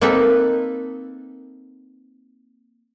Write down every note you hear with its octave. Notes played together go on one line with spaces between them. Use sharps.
A#3 C4 D#4 A4 B4